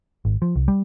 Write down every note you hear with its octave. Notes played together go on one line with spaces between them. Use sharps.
G#1
F3
C2
G3